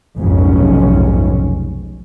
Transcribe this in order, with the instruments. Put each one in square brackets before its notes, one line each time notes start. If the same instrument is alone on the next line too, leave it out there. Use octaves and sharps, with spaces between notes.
[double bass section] F1 B1 F2 G#2 C#4